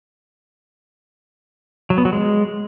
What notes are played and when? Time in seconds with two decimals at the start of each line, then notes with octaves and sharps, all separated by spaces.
1.90 F#3
1.98 B3
2.05 F#3
2.13 G#3